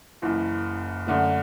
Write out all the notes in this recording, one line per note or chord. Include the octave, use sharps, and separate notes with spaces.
F#1 F#2 E3
F#2 D3 A3